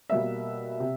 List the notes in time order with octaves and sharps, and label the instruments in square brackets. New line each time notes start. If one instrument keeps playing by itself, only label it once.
[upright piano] B2 G3 A#3 E5
C3